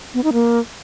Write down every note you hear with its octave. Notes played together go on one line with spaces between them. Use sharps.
B3
D#4
A#3